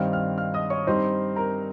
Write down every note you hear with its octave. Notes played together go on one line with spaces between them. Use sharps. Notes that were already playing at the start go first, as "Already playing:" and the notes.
Already playing: G2 D#3 G3 C4 F5 F6
F5 F6
F5 F6
D#5 D#6
C#5 C#6
G2 G3 C4 D#4 C5 C6
A#4 A#5